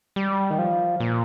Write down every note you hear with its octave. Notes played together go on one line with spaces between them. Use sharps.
G3
D#3
F3
A#2